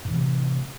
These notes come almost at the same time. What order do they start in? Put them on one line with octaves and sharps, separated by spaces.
A2 E3 C3